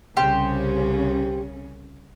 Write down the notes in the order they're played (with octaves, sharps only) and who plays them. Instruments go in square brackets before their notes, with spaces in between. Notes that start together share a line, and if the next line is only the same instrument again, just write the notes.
[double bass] C2 [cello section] C#3 C#4 [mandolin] G4 C5